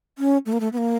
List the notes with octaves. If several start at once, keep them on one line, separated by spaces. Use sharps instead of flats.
C#4
A3
A#3
A3
B3
A#3